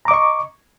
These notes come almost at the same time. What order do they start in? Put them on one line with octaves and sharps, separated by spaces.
A#5 D6 D#5 C#6